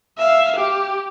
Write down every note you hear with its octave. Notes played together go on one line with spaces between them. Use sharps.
E5 F5
G4